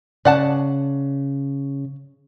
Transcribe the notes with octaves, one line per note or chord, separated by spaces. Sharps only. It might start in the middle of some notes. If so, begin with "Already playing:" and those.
C#3 D5 F#5 A5